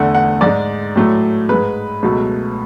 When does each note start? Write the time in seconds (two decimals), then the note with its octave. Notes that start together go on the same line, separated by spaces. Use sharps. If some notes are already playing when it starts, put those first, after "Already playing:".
Already playing: E2 D3 A3 F#5
0.15 F#5
0.41 G#2 G#3 D5
0.96 A2 F#3 A3
1.49 G#3 B4
1.54 G#2
2.03 C#2 B2 F#3 A3